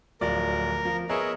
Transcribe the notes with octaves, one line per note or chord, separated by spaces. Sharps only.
D1 F3 A#4 D5
F3
B3 G#4 A#4 C#5 D#5 E5